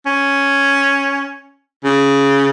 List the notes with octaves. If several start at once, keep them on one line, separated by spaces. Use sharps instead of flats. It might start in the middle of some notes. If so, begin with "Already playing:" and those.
C#4
C#3